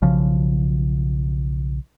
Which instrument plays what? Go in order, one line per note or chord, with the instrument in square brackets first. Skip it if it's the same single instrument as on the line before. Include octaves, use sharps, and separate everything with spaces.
[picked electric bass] B1 C#3 F3